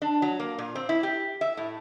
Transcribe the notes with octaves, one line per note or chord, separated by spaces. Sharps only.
D4
F#3
A#3
A#2
C4
E4
G4
E5
A2